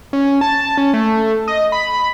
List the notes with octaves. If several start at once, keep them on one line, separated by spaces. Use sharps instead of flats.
C#4
A5
C#4
A3
D#5
B5